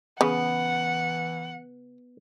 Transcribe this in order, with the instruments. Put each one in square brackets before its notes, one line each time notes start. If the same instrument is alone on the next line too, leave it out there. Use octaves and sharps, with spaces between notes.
[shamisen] C#3 [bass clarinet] E3 [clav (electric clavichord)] B3 [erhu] F#5